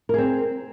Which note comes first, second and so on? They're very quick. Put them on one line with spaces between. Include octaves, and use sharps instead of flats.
A#4 G#4 C4